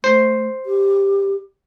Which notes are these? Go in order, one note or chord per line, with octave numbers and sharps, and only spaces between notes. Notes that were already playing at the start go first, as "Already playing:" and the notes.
A3 C5
G4